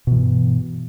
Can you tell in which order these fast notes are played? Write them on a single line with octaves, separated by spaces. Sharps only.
B2 E3 G2